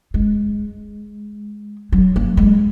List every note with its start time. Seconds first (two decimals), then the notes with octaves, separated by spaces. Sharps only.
0.14 G#3
1.92 F#3
2.16 A#3
2.37 G#3